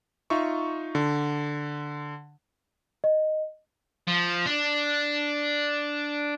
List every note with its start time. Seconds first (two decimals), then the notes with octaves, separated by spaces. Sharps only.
0.30 D#4 F4 E5 C#6
0.95 D3
3.04 D#5
4.08 F3
4.46 D4